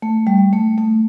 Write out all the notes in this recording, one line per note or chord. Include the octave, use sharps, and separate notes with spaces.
A3
G3
A3
A3